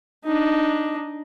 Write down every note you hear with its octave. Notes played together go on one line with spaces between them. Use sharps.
D4 D#4